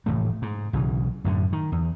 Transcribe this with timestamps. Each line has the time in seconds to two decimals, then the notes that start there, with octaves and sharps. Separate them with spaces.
0.06 F1 A2 E3 A3
0.42 G#2
0.73 B1 C#3 E3
1.24 F#2 A2 D3
1.53 D#3
1.72 E2